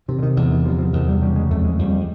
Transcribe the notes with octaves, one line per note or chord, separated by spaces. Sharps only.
C3 D#3
D3
D#3
E2 D3
D#3
C3 F3
F3
E2 D#3
G3
C#3 G3
G#3
F2 A3
G#3
F2 G3